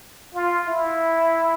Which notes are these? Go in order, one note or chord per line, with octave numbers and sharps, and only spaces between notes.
F4
E4